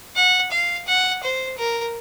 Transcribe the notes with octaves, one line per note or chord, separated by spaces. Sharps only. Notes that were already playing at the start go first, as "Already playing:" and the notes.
F#5
F5
F#5
C5
A#4